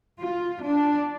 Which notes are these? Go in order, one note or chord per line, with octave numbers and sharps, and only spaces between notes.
F4
D4